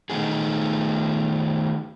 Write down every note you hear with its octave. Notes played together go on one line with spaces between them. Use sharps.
D#3 A3 D#4 G#4